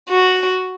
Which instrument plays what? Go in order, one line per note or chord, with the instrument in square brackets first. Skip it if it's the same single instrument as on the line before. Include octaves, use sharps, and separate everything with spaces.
[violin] F#4